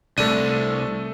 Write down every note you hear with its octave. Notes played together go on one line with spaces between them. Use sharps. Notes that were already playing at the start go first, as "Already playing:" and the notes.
C2 A3 D4 A4 D#7